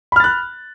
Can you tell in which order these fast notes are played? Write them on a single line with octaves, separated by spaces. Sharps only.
B5 F6 A6 F#6